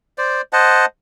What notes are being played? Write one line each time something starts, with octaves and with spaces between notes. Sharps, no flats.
C5 D5
C5 D#5 F#5 A5